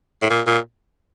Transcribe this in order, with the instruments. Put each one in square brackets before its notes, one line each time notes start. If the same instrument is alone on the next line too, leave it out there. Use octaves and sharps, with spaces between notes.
[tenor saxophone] A2
A#2
A#2